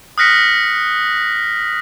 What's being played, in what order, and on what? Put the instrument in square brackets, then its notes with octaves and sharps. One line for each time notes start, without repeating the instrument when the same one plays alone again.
[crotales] D#6 F6 F#6 A#6 B6 C#7